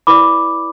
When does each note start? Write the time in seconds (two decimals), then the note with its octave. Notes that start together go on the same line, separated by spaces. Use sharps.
0.07 E4 B4 D5 B5 D6